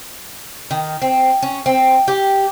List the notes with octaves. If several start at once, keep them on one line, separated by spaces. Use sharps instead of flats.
D#3
C4
C#4
C4
G4